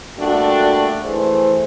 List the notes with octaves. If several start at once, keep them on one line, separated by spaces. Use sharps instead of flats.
A#2 G3 A3 D4 F#4
E3 A3 G#4 C5